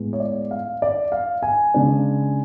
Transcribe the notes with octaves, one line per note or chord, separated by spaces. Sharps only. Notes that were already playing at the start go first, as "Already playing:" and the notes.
Already playing: A2 G#3 B3
C#5
D5
F5
D5
F5
G#5
C#3 G#3 D4